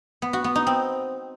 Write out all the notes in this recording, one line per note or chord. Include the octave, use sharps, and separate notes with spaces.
B3
F#4
B3
D#4
C4